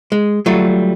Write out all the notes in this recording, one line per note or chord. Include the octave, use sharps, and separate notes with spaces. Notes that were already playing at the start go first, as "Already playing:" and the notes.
G#3
F#3 G3 A3 F4